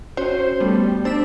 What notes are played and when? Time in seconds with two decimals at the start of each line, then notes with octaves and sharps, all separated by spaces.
0.17 C#4 F#4 C5 C#5
0.60 G3 A3 B3
1.05 D4 C5 E6 B6